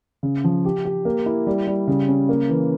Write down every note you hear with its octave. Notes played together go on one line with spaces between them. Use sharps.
C#3
F3
G4
G4
A#3
E4
G3
G3
C#3
C#4
A#3
E3